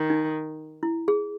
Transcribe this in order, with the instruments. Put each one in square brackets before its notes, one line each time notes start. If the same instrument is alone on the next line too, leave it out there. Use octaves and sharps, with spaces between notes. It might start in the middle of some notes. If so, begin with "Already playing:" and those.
Already playing: [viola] D#3
[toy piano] D#4
E4
G#4